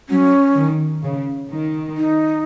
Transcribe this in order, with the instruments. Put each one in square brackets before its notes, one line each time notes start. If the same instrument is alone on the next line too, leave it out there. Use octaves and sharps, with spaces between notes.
[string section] F#3 [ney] C#4
[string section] D#3
C#3
D#3
[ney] D#4